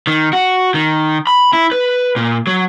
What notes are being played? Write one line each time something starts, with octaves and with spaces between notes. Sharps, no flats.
D#3
F#4
D#3
B5
E4
B4
A#2
F#3